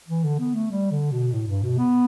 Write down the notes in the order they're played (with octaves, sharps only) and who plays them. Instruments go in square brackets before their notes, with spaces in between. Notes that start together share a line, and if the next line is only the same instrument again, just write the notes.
[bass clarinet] E3
D3
B3
A3
G3
D3
B2
A2
G2
B2
B3